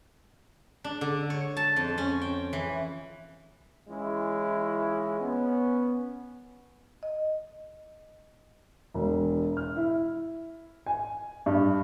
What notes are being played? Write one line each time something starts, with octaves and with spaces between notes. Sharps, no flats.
D4
D3
C#5
A5
F2
C#4
G5
E3
E3 G#3 C#4 E4 F4
B3 C#4
D#5
E1
F6
E4
G#5
G2